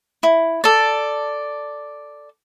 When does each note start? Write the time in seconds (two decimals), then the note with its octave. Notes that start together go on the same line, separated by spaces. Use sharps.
0.23 E4
0.64 A4 D5